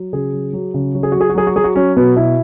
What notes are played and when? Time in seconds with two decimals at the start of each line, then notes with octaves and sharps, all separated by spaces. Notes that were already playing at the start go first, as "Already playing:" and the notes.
Already playing: F#3
0.13 C#3 G#4
0.34 F#3
0.53 F#3
0.74 C#3
0.95 F#3 F#4
1.03 G#4
1.12 F#3 F#4
1.21 G#4
1.30 F#4
1.35 F#3 G#4
1.47 F#4
1.56 F#3 G#4
1.64 F#4
1.76 F#3 C#4
1.96 B2 B3
2.16 B2 E4